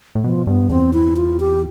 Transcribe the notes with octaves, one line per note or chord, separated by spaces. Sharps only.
A2
B2 F3
G2 B3
E2 C4
E4
F4
G4